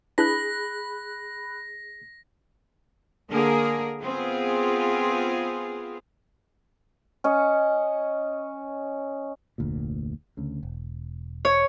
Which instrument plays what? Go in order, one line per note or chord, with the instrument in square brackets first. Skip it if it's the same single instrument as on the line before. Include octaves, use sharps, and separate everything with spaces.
[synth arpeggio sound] D4 E4 B4 [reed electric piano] G#4 [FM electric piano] B5 F#6 [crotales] A#6
[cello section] D3 A#3 G#4 A#4
B3 C4 F4 G#4
[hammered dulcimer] C#4 D#5
[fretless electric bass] F1 D2 A#2
D2 C#3
E1
[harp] C#5